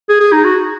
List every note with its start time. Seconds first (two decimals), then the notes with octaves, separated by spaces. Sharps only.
0.09 G#4
0.21 G#4
0.33 D#4
0.44 F#4